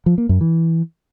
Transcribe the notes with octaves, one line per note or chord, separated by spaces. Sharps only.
F3
A#3
F#2
E3